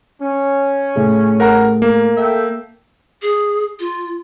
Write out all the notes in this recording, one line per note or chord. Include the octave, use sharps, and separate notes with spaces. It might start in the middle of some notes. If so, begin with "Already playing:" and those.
C#4
A2 G#4
A#4 F#5 A#5
A#3
A4 E5 G5
G#4
F4